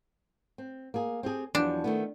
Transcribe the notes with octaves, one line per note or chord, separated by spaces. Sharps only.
C4
A#3 G#4
C4 G4 G#4
E2 F3 F#3 D4
D#3 A3 B3